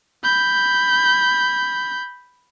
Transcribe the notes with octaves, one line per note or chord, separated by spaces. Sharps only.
B5 G6